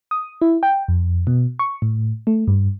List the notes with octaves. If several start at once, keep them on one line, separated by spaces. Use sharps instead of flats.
D#6
E4
G5
F2
B2
C#6
A2
A3
G2